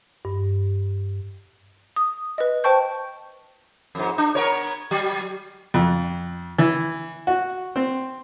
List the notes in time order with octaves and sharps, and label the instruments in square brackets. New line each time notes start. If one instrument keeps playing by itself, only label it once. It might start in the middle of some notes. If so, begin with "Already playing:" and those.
[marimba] G2
[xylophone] D#6
B4 D#5
C5 G5 A5 C#6 G6
[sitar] F2 G#2
D4
B3 A#4 C#5
F#3
[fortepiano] F2
E3
F#4
C4